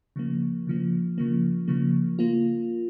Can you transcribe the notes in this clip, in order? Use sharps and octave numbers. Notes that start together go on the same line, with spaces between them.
C#3 F3 A#3
C#3 F3 A#3
C#3 F3 A#3
C#3 F3 A#3
A#3 F4